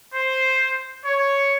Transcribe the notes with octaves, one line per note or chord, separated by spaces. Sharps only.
C5
C#5